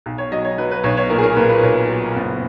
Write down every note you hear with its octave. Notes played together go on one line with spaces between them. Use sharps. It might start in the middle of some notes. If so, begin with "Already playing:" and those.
B1
C#5
F#3 D#5
C#5
F#3 B4
B4
B1 C#5
C#5
A#2 A#4
G#4
A#4
A#2 B4
B4
B1 C#5
F#3 A#4
F#1 B3